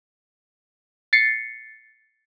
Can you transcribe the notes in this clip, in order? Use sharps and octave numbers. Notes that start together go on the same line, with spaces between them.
A6 C7 C#7